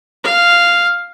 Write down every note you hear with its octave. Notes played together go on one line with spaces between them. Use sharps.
F5